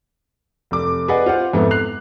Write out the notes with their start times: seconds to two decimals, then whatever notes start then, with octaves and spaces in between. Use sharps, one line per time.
0.71 F1 D6
1.08 G#4 B4 D5 D#5 F#5
1.26 F4 C5 F5 F#5
1.53 F2 G#2 B3 E4 A4
1.71 F#6 C7 F7